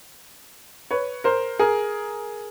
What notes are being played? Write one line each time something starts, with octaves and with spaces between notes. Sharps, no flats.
B4 C#5
A#4 C5
G#4 A#4